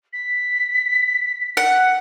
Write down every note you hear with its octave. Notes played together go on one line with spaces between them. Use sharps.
B6
F#5